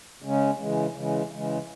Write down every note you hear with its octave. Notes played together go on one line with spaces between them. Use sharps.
C#3 G#3 C#4
C#3 E3 G#3
C#3 E3 G#3
C#3 E3 G#3